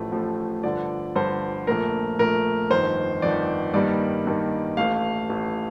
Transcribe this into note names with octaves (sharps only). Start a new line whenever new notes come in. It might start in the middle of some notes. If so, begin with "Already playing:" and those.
Already playing: A1 A2 F3 A3
A1 A2 F3 A3
G1 G2 D3 F3 D5
G1 G2 D3 F3 C5
A#1 A#2 A3 A#4
A#1 A#2 A3 A#4
G1 F2 D#3 C5
G1 F2 D#3 D5
G2 D#3 G3 A#3 D5
G2 D#3 G3 A#3
A1 A2 A3 F5
A1 A2 A3